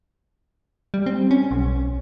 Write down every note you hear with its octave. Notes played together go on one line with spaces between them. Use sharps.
G3
C4
C#4
B1